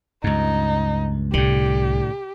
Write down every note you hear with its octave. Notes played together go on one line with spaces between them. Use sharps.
C#2 G2 D#4
C2 A2 D3 G4